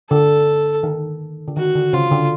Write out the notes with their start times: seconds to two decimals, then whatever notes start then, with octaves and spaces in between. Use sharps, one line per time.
0.10 D3 A4
0.83 D#3
1.48 D3
1.56 D#3 F#4
1.75 D3
1.93 C#3 F4
2.11 D3